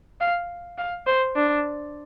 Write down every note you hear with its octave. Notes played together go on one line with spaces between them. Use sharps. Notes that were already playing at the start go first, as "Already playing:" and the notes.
F5
F5
C5
D4